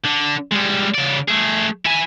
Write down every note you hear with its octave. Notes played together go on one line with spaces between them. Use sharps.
D3
G3 G#3
C#3 D5
A3 G#4
E4 G#5